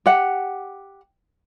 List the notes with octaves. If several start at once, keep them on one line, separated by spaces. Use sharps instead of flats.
G4 F#5